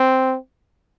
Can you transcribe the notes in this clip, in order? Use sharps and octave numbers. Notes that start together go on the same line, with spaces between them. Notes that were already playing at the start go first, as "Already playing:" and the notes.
Already playing: C4